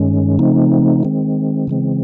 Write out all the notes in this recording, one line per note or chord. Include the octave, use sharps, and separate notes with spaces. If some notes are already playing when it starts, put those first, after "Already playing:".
Already playing: G2 D#3 G#3 C#4
C#3 F3 A3 C4 D#4
D#3 G#3 C4
C#3 E3 G#3 C4